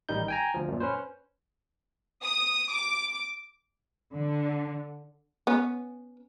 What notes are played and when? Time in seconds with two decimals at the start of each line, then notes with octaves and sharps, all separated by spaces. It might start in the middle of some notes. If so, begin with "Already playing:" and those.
0.09 A1 D#3 G3 D#4 G6
0.28 G5 G#5 A#5
0.54 D2 F3
0.68 F#2 A#2
0.80 C#4 B4 C5
2.23 D#6
2.71 D6
4.13 D3
5.47 B3 C#4